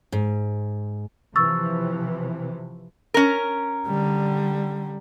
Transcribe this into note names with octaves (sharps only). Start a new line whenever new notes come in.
G#2
C3 E3 F3 C#6 E6 A6
C#4 A#4
D3 G3